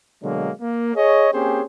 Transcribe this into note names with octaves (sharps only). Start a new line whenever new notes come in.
B2 D3 F#3 G#3 A#3
A#3
G#4 C#5 D#5
A#3 C4 C#4 G4 G#4 C5